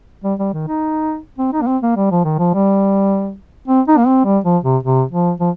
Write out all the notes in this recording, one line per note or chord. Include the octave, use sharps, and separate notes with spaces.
G3
G3
D#3
D#4
C4
D#4
A#3
C4
A#3
G3
F3
D#3
F3
G3
C4
D#4
A#3
C4
G3
F3
C3
C3
F3
F3